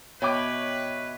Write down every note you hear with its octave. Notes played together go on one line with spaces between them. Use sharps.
B2 B4 C#5 D#5 E5 G5 C#6 D6